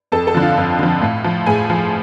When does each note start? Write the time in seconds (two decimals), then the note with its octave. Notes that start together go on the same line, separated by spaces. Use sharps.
0.12 F2 A4 A5
0.27 A4 A5
0.35 D3 F3
0.42 F4 F5
0.57 F2
0.79 D3 F3
1.01 A2
1.24 F3
1.46 A2 G#4 G#5
1.70 F3